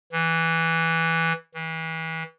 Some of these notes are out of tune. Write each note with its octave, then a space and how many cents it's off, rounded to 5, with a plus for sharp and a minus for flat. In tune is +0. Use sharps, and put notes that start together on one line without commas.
E3 -5
E3 -30